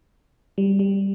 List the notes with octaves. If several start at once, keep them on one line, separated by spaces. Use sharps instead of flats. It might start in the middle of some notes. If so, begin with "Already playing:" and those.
G3
G3